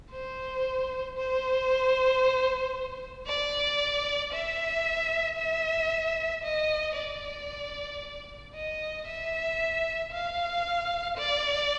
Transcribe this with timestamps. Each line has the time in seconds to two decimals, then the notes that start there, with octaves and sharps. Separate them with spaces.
0.11 C5
1.17 C5
3.27 D5
4.33 E5
5.38 E5
6.44 D#5
6.97 D5
8.55 D#5
9.07 E5
10.12 F5
11.17 D5